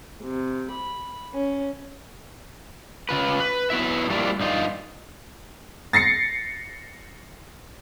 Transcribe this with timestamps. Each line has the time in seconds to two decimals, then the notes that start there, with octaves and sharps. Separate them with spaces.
0.22 C3
0.70 B5
1.34 C#4
3.09 C#3 F4 B4
3.40 B4
3.70 F#3 B3 E4 E5
4.10 G3 A#3 D4 E4 F4
4.40 G2 D#4 F4
5.93 A6 A#6 C7 C#7